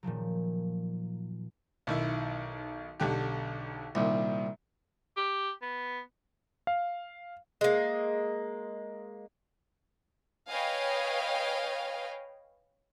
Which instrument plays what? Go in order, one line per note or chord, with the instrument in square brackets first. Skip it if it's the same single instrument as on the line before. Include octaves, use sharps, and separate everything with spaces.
[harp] A#2 D#3 F3 F#3
[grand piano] B1 D#3 E4
B1 D3 G4
[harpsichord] C2 [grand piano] A#2 D#3
[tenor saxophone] G4
B3
[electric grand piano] F5
[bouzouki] G#3 A#3
[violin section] B4 C#5 D#5 F5 G5 G#5